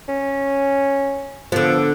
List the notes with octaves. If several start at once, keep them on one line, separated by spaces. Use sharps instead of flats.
C#4
D3 F3 B3